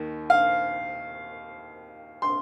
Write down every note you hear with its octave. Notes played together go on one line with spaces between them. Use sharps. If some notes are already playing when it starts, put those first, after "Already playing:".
Already playing: D#2 D#3
F5
C6